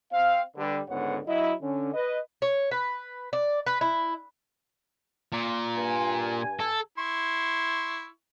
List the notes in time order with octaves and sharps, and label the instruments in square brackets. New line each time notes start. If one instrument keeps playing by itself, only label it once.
[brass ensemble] C4 F5
D3 G3 B4
C#2 G#2 D3 B3 C#5 F#5
F#3 E4 D#5
D3 C#4
B4 D#5
[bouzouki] C#5
B4
D5
B4
E4
[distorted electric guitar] A#2
[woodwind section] G2 G#5
[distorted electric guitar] A4
[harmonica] E4 C6 C#6